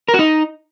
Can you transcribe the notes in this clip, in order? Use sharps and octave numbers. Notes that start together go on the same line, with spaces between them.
A#4
F#4
D#4